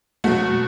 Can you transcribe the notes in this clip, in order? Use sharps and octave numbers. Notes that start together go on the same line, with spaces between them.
B2 F#3 A3 F#4